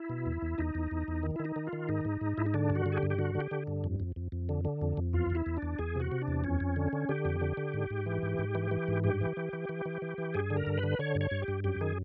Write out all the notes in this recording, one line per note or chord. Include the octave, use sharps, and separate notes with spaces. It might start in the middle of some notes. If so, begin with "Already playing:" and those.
Already playing: E4
B2
E2
E2
E2 D#4
E2
E2
E2
D#3
D#3 E4
D#4
D#3
F4
D#3
G#2 D#4
G#2
G#2
G#2 E4
D#4
D3 D4
G2
F#4
D3
G#4
G4
G2
G4
D3 F#4
D3
G4
D3
G2
F2
F2
F2
F2
D3
D3
F2
F2
E2 F4
E2
E4
E2
D4
E2
E2 G#4
C3 F#4
C3
D4
E2
F2 C#4
F2
D3
D3
D3 G4
F2
D3
D3
G#2
G#2
E3
G#2
G#2
E3
E3
G#2
G2 G4
E3
E3
E3
E3
E3
E3
E3
G2 G#4
D3
A#4
G2
B4
D3
D3 C#5
G2
C#5
G2
G4
G2
F#2 G4
D#3 G#4